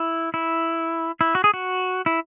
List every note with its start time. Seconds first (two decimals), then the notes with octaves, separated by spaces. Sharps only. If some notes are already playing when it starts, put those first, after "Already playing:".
Already playing: E4
0.34 E4
1.21 E4
1.35 F#4
1.44 G#4
1.54 F#4
2.06 E4